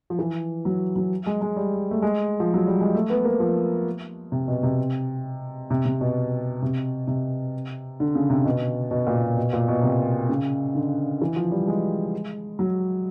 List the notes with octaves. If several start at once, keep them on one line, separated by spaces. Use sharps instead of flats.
F3
E3
F#3
F#3
G#3
G#3
G3
A3
G#3
F3
F#3
G3
G#3
A3
B3
A#3
F3
C3
B2
C3
C3
C3
B2
C3
C3
D3
C#3
C3
B2
B2
A#2
B2
B2
A#2
B2
C3
C#3
D3
E3
F3
G3
G#3
F#3